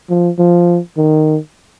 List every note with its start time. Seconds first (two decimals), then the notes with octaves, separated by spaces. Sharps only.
0.10 F3
0.39 F3
0.97 D#3